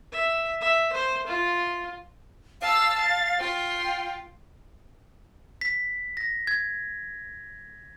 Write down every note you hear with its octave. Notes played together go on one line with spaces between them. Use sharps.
E5
E5
C5
F4
F5 A5 E6
A6
F4 G5
B6
A#6
G#6